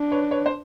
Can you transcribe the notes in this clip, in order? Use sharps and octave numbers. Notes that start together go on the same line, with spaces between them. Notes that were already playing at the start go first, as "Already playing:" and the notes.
Already playing: D4
B4 C#5
B4 C#5
C5